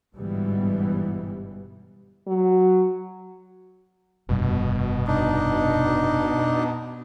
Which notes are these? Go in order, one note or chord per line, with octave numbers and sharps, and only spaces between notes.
G1 G#2 B2 E3 G3 B3
F#3
F1 G2 B2
D4 D#4